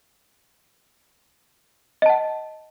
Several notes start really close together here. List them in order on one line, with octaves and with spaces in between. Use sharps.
D#5 A5 F#5